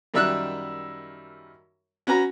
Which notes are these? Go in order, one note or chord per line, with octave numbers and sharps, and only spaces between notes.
F#2 D#3 G3 E5 E6 F#6
C#4 F#4 B4 A#5